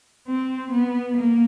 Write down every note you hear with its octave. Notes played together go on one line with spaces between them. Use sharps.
C4
B3
A#3